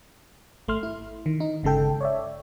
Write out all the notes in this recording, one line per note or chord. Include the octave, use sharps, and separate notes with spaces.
G#1 A3 C6 F6
E4
D#3
D#4
G1 C#3 G#3 A4 G5
C#5 D5 E5